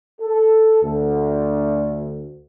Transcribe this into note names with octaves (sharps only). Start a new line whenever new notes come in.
A4
D2